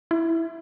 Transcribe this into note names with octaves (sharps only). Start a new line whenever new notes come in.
E4